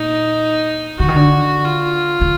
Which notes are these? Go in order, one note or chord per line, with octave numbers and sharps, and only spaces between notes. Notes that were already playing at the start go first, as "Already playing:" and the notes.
Already playing: A#2 D#4
D3 F#4
D#3
D3
F4
D3